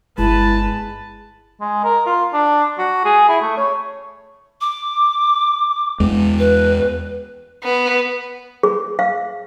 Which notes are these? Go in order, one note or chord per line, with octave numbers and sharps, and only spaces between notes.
G1 G#3 E4 B4 A5
G#3
A#4
F4
D4
F#4
G#4
E4
A3
C#5
D6
E2 G#3
B4
B3
G#4
F5